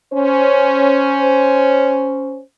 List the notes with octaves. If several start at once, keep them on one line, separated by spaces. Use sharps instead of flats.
C#4 C5